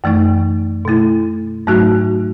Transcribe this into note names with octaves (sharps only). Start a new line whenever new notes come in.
F#2 E3 A3 D#4
B2 A3 E4
G#2 F#3 A3 D#4 F#4